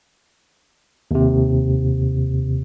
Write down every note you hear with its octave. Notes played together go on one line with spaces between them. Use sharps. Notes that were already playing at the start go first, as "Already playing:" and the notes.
D#2 C3